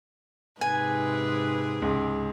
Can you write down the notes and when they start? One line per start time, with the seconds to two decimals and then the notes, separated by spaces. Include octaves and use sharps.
0.61 G#2 C3 G#4 B4 G#5
1.82 C#2